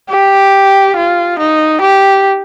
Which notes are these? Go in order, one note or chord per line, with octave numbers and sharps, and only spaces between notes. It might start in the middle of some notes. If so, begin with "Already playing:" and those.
G4
F4
D#4
G4